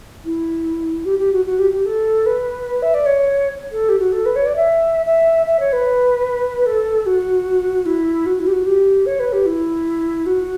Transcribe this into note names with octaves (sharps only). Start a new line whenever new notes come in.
E4
G4
G4
F#4
F#4
G4
G4
A4
B4
E5
D5
C#5
A4
G4
F#4
A4
B4
C#5
D5
E5
E5
E5
C#5
B4
A4
F#4
E4
F#4
E4
G4
F#4
G4
C#5
B4
G4
E4
F#4